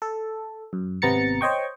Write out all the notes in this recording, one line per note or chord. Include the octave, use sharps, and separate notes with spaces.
A4
F#2
G#1 C3 B3 A#5 A6 C#7
C5 C#5 D#5 G5 C#6